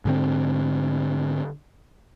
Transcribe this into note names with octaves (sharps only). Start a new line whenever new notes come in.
G#2 D3 C4